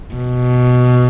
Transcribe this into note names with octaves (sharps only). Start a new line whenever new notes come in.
B2